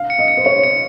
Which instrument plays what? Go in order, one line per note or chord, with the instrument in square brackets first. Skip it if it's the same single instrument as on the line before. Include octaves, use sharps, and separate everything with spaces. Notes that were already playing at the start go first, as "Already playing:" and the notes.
Already playing: [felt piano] F5
[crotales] C#7
[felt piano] D#5
[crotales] C#7
[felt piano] C5
[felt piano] C#5 [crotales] C#7
[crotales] C#7